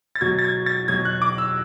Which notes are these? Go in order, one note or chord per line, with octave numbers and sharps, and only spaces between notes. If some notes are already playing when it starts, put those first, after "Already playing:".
A6
B2 F#3 G#6
A6
G#6
A6
B2 F#3 G#6
F#6
D6
E6